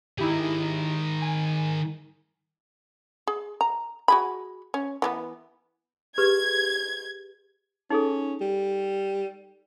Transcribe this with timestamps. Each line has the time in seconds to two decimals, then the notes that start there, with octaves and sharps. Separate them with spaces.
0.18 D#3 D#4 E4 G4 G#4
1.22 G#5
3.27 G#4
3.61 A#5
4.08 F#4 G#4 B5
4.74 C#4
5.02 E3 G3 B3
6.18 G4 G#4 B4 G#6
7.90 C#4 D#4 G#4 A4
8.41 G3